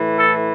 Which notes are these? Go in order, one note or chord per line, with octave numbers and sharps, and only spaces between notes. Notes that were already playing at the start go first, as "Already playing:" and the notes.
Already playing: A2 E3
A4